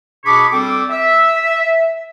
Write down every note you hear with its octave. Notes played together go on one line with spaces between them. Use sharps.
B2 D4 G#4 B5 C#6 D6
G3 C4 A4 D6
E5